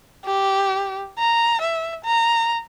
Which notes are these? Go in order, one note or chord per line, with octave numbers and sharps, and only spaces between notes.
G4
A#5
E5
A#5